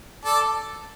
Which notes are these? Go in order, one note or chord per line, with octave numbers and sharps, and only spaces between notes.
A4 D5